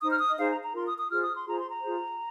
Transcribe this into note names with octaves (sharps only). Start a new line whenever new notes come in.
D#4 C5 D#6
F6
D#6
D#5
D#4 G#4 C5 F5
A#5
A#5
F4 A#4 C6
D#6
D#6
F4 G#4 C5 F6
D#6
C6
F4 G#4 C5 A#5
C6
A#5
F4 G#4 C5